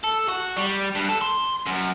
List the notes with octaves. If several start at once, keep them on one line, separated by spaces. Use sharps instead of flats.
A4
F#4
G3
G2
A4
C6
F#2